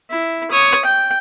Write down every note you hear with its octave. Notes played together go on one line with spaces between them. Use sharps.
E4
C#5 D#6
G5